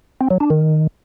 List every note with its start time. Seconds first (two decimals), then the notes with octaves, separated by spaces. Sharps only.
0.21 C4
0.31 F#3
0.40 D4
0.50 D#3